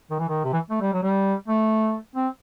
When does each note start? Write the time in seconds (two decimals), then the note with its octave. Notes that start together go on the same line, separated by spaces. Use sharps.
0.11 D#3
0.19 E3
0.28 D#3
0.44 C3
0.53 E3
0.70 A3
0.81 G3
0.93 F#3
1.03 G3
1.48 A3
2.15 C4